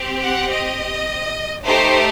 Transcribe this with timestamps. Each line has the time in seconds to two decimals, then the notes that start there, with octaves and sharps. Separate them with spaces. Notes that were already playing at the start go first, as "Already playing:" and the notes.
Already playing: C4 G4
0.23 F#5
0.51 D#5
1.64 A3 D#4 G4 C5